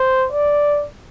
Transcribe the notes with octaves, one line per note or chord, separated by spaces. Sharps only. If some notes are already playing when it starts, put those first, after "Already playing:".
Already playing: C5
D5